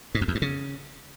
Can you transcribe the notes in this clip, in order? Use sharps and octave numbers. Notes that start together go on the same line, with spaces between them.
G#2
F2
E2
G2
C#3